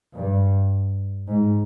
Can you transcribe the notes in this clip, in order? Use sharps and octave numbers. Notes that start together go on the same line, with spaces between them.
G2
G#2